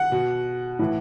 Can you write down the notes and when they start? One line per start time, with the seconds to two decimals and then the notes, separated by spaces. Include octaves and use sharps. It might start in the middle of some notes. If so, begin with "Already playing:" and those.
Already playing: F#5
0.12 B2
0.79 A2 E3